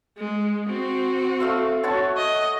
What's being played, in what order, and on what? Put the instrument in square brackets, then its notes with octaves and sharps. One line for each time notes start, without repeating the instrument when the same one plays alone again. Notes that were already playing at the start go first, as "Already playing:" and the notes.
[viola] G#3
C4 F#4
[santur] A3 F5 E6
F#4 C#5 A5
[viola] D#5